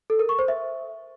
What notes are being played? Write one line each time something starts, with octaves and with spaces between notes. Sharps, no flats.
A4
A#4
C#6
C5
E5